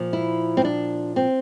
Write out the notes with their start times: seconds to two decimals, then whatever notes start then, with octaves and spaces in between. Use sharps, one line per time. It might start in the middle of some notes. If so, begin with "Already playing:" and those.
Already playing: A#2 F3
0.13 E4
0.57 C4
0.65 D4
1.16 C4